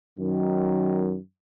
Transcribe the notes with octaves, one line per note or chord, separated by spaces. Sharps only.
F#2 D#3 F#3